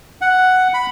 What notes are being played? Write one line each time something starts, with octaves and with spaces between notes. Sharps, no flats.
F#5
B5